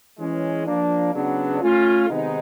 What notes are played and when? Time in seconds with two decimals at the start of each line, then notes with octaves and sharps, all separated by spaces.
0.18 E3 G#3 C#4
0.66 F3 A#3 D4
1.14 C#3 F#3 B3 D4
1.61 A3 C#4 F4
2.09 C3 D#3 G#3 B3 D#4